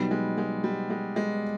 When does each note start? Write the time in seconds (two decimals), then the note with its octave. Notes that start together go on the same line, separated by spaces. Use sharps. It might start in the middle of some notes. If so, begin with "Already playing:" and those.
Already playing: B2 F#3 G3 B3 D#4
0.11 G#3
0.38 G#3
0.64 G3
0.90 G#3
1.16 G#3